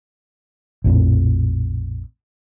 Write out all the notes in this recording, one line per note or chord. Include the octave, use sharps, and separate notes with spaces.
A#1 F2 A2